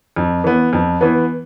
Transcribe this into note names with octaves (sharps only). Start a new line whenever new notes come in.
F2
E3 B3
F2
E3 B3